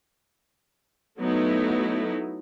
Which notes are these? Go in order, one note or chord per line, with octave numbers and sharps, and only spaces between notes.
F#3 A3 B3 D#4 E4